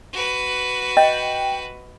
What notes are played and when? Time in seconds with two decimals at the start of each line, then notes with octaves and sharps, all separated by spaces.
0.13 F#4 B4
0.97 D#5 G5